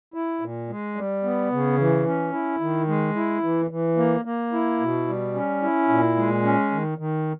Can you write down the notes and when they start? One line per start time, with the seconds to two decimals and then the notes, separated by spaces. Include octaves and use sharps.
0.14 E4
0.41 A#2
0.69 G#3
0.96 G3
1.24 B3
1.52 C#3
1.78 E3
2.06 C#4
2.33 E4
2.60 D#3
2.88 G#3
3.16 E4
3.43 E3
3.71 E3
3.97 A#3
4.25 A#3
4.52 E4
4.80 B2
5.08 G3
5.34 C#4
5.62 E4
5.89 A#2
6.16 G#3
6.43 C#4
6.71 D#3
6.98 D#3